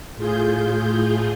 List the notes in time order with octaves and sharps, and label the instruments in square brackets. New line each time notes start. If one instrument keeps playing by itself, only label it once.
[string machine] A2 F4 G#4 G6